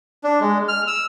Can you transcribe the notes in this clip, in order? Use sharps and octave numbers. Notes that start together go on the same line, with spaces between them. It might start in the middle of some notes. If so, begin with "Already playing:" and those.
D4
G#3
F6
E6